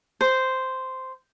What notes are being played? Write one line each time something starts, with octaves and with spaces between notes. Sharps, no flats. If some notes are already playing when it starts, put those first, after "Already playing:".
C5